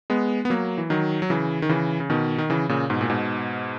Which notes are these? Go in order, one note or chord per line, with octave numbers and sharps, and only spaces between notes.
G#3 B3
B3
F#3 A#3
E3
D#3 F#3
F#3
C#3 E3
D#3
C#3 E3
C#3
B2 D#3
D#3
C#3 E3
A#2 C#3
G#2 B2
A#2
G#2 B2